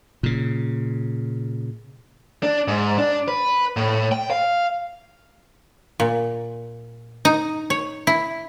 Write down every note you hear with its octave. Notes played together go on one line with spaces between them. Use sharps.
A#2 C#3
D4
G#2
D4
B4
A2
G5
F5
A#2
D#4
C#5
E4